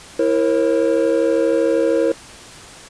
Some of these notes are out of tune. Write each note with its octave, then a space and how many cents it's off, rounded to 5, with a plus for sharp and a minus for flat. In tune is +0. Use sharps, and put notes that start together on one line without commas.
E4 +5 A#4 +5 C#5 -45